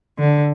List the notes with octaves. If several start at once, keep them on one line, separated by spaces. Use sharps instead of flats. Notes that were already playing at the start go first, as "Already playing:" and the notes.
D3